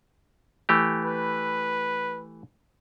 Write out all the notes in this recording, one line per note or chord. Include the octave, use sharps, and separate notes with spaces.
E3 A3 G4
B4